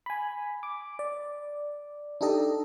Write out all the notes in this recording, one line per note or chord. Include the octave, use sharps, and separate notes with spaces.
G#5 B5
D6
D5
D4 D#4 G4 A4 D#5